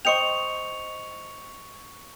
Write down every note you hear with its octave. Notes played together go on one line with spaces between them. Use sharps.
C5 D#5 G5 C#6 C#7 F7